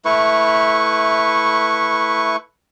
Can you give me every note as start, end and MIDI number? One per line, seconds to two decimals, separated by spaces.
0.05 2.36 57
0.05 2.36 64
0.05 2.36 71
0.05 2.36 85